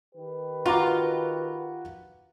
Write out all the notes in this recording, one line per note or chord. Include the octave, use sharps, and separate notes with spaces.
D#3 G4 B4
F4 F#4 A#5 D6